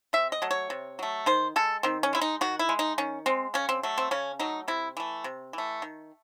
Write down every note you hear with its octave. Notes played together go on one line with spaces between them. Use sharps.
C3 E5
D#5
F#3 A3
C#5
C3
F#3 A3
D#3 C5
G#3 A4
D#3 C4
C#4
G#3 E4
D#4
D#3 F#4
E4
G#3
D#4
D#3 C#4
G#3 C4
C#3 C#4
C4
F#3 A3
C4
C#3 C#4
F#3 A3 D#4
C3 E4
E3 A3
C3
E3 A3
D#3